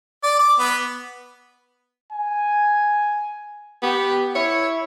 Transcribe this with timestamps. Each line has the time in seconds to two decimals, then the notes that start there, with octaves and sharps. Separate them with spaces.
0.23 D5
0.39 D6
0.59 B3
2.12 G#5
3.83 B3 G4
4.35 E4 C#5